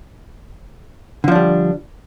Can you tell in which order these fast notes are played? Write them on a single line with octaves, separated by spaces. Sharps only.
D3 F3 D4 G3